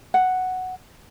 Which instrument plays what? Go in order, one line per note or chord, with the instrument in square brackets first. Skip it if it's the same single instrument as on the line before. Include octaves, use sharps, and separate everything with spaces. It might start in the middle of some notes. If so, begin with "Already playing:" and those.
[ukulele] F#5